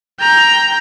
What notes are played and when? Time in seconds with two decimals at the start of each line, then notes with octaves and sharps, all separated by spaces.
0.21 G5 A#5